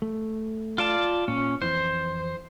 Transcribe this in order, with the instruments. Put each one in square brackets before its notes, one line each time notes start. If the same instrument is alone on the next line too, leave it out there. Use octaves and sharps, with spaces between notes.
[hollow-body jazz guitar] A3
[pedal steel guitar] F4 D5 A5
[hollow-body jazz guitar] A#2 [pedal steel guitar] C#4
[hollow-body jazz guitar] F2 E3 [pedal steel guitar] C5